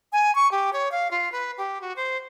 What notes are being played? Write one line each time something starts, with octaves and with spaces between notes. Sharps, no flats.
G#5
C#6
G4
C#5
F5
F4
B4
G4
F#4
C5